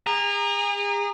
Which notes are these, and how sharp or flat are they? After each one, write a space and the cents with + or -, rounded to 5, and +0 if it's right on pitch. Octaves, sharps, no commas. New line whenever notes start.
G#4 -40 A#5 +0